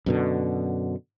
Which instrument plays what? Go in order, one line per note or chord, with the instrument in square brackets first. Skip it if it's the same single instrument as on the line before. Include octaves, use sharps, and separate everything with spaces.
[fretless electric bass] F#2 B2 D3